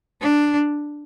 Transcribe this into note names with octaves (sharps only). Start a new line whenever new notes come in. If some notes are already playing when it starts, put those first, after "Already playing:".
D4